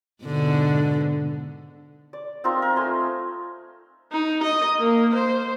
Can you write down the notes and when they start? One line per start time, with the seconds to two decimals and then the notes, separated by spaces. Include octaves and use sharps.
0.24 G#2 B2 D3
2.13 D5
2.44 C4 D#4 F4 A#4
2.62 A#4
2.76 A3 G#5 C6
4.12 D#4
4.43 D#5
4.79 A#3
5.15 C5